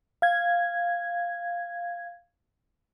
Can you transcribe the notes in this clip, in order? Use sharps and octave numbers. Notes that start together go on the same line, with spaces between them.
F5 G#6